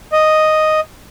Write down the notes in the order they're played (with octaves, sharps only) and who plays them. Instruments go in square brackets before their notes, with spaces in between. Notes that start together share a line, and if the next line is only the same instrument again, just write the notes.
[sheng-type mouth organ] D#5